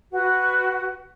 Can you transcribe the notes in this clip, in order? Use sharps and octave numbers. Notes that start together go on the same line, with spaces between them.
F#4 B4